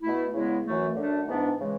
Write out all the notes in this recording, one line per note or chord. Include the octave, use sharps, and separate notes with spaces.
B2 A3 E4
E2 C#3 G#3 B3 E4
F#2 E3 A3
F#2 D3 A3 D4
G#2 E3 B3 D4
C#3 E3 G#3